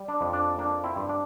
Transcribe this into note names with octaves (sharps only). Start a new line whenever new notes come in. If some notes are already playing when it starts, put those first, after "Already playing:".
Already playing: G3
D4
F2
D4
A#3 D4
C4 E4
G2
D4